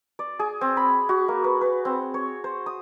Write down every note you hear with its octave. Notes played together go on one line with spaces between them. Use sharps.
D5
G#4
C4
B5
F#4
A#3
B4
B4
C4
C#5
C5
D#6